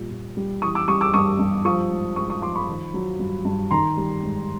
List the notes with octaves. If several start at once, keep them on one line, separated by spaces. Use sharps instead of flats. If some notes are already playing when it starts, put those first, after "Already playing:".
Already playing: A#2 G3
A#2
G3
E3 C#6 D#6
D6 E6
G3 C#6 D#6
D6 E6
G2 C#6 D#6
G2
F3 C#6 D#6
G#2
G#2 C#6 D#6
C#6 D#6
F3 C6 D6
B5 C#6
D#3
F#3
G2
G2
D#3 A#5 C6
G3
G#2